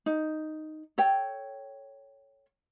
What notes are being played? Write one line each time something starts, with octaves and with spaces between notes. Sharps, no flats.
D#4
A4 C#5 G5